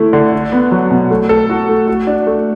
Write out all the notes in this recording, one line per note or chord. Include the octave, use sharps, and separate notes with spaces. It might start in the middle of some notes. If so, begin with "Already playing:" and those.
Already playing: D3 A3 E4
D3
D4
B3
F#3
B2
A3
A4
F#4
A3
F#4
D4
A3